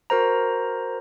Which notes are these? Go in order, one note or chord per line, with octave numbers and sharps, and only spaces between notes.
F#4 A#4 C5 A#5